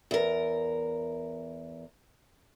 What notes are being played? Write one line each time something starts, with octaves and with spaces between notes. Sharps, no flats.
E2 A#4